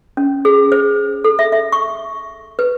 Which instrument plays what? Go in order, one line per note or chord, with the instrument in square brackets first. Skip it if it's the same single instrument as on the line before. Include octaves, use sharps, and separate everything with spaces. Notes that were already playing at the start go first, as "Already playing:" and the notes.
[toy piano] C#4
G#4
C5
A4
E5
E5
C#6
B4